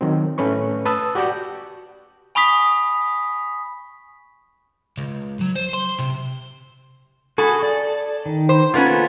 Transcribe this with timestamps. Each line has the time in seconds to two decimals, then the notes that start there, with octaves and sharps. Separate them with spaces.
0.01 D#3 F#3 C4
0.38 A2 A3 C#4 B4 C#6
0.85 B4 A5 D#6 E6
1.15 F#4 G4 D5 F#5 G5
2.35 G#5 B5 C#6 D#6 B6
4.97 C#2
5.41 F#3
5.55 C5
5.73 C6
5.99 C3
7.38 F#4 G#4 A4 B5
7.63 D5
8.26 D#3
8.49 C5
8.74 A#3 B3 C#4 F4 A4